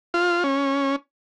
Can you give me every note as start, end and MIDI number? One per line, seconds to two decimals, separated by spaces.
0.14 0.43 65
0.44 0.96 61